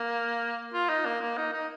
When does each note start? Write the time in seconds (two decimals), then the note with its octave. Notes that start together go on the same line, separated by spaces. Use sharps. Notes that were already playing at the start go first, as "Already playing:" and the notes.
Already playing: A#3
0.74 F4
0.89 D#4
1.05 A#3
1.21 A#3
1.37 D#4
1.53 D#4